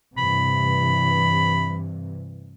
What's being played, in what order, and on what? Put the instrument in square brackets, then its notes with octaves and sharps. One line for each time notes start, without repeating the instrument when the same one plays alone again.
[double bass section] G2 C3 E3 [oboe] B5